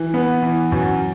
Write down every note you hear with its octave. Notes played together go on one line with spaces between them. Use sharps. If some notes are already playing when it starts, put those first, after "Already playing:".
Already playing: E3
B3
E3
F#2